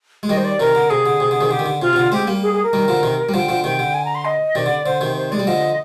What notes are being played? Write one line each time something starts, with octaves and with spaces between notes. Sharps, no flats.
G#3
D#3 G3 D#5
C5
D5
C3 D#3 A#4
D3
C3 G#4
D3
C3
D3
C3 D#3
D3 G4
D#3
D3
C3 F4
C3
D3
G#3 C4 G4
G3 A#3
G#4
G#4
A#4
D#3 G3
D3 F3
C3 D#3
G3
D3 F3 G5
D3 F3
C3 D#3 G5
D3
G#5
A#5
C6
D#5
C3 D#3 D5
D3
D3 C5
C3 D#3
C5
G#3 D5
G3
D3 F3 D#5